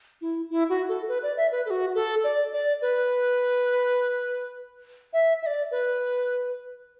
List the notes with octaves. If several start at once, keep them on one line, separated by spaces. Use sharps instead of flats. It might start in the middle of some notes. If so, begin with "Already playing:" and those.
E4
E4
F#4
A4
B4
D5
E5
B4
A4
F#4
A4
D5
D5
B4
E5
E5
D5
B4